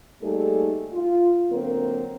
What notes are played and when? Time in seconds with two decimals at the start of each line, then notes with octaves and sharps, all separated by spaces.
0.22 G3 A3 A#3 D#4 G#4 A4
0.93 F4
1.51 D3 F#3 A#3 C4 A#4